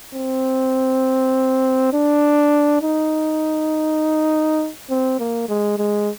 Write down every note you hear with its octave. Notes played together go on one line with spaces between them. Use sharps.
C4
D4
D#4
C4
A#3
G#3
G#3